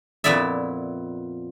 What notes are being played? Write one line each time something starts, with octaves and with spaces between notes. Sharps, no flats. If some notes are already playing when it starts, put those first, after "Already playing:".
F2 A#2 B3 E4 D5 E5